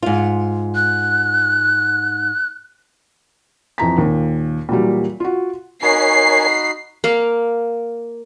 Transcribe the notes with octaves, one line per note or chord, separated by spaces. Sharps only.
G#2 F4
F#6
F2 E3 A#5 B6
D#2 A#2
A#2 E3 F#3 G3
F4 F#4
D#4 F#4 A#4 C#5 G#5 B5 C7
A#3 F5